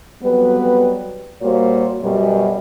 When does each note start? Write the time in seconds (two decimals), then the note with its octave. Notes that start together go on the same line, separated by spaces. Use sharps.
0.23 F2 F#3 G3 B3 B4
1.42 A#2 G3 A#3 F#4 C5 C#5
2.01 F#2 B2 G3